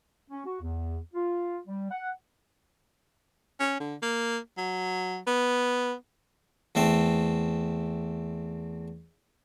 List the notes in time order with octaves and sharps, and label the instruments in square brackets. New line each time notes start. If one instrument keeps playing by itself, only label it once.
[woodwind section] C#4
F#4
E2
F4
G3
F#5
[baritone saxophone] C#4
D3
A#3
F#3
B3
[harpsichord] E2 A3 C4